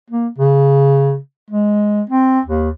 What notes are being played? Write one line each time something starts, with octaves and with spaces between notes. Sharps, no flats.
A#3
C#3
G#3
C4
D#2